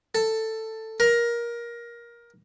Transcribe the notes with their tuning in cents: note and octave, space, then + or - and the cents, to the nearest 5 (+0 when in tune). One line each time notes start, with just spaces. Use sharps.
A4 +10
A#4 +15